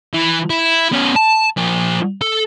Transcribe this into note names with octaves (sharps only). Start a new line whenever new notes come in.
E3
E4
B3 C#4
A5
F3 A#4
A4